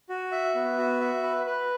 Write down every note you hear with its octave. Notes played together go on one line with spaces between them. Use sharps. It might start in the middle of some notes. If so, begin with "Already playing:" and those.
F#4
E5
B3
F#4
E5
B4
B4